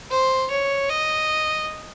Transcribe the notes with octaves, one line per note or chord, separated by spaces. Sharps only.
C5
C#5
D#5